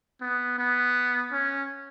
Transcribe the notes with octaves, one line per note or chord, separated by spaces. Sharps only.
B3
B3
C#4